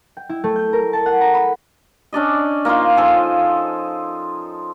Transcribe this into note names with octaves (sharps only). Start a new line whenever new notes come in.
G5
E4
A3
G6
A#4
A5
F#5
A#5
B5
C#4 D4 D5 D#5
A#3 D#4 F4 C5
F3 A4 G#5